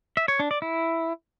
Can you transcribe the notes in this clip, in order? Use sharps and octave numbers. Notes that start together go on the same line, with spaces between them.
E5
C#5
D4
D5
E4